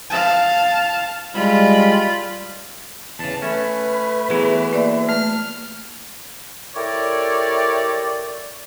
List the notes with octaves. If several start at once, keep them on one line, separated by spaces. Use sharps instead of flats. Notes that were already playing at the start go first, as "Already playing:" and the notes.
F5 A5
G3 G#3 F4 B5
E2 C#3 A5
A3 C#4 B4
E3 F#3 B3 G#4
A#3 D5 E5
A3 F6
E4 G4 A4 A#4 C#5 D5